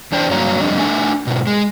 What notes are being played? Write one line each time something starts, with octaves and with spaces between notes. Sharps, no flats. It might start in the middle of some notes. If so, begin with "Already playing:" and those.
E2 D4 C5 G5
G2 F#3 A#3 C#5 F5 A#5
F2 G3 D4 D#5
A3 D4 E5 G#5
G#2 B2
G#3